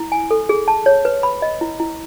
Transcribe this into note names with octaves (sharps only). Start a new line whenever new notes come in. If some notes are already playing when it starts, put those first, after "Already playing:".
Already playing: E4
G#5
A4
G#4
A5
C#5
B4
B5
D#5
E4
E4